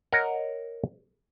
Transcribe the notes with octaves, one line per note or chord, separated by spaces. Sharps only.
A#4 C#5 D#5 F#5